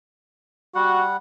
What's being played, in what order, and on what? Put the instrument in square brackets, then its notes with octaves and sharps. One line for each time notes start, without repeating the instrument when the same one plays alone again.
[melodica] G3 F#5 [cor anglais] F#4